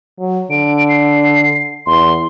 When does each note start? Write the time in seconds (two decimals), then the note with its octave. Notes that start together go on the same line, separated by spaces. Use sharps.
0.19 F#3
0.51 D3 D7
0.89 C7
1.86 E2 C6